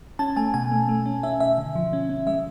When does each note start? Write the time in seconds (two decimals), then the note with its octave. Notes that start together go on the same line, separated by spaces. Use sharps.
0.19 C#4 A5
0.36 A3 G#5
0.54 B2 G#5
0.72 A3
0.89 A3
1.06 C#4
1.23 C#4 E5
1.40 B2 E5
1.58 D3
1.75 F3
1.93 C#4
2.09 C#4
2.27 G#3 E5